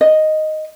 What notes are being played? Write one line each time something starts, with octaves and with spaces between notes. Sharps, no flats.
D#5